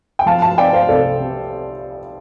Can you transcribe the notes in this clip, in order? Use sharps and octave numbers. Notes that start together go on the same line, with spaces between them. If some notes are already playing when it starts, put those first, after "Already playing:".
G5
F3 F5 A5
F5 A5
C4 D5 G5
C5 F5
C2 A4 D5
C3